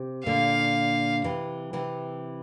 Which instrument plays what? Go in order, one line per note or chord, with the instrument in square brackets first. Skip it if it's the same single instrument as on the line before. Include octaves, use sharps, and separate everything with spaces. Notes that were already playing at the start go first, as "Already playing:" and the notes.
Already playing: [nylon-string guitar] C3
[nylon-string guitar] A#2 D3 [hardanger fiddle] F5
[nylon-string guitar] C3 E3
C3 E3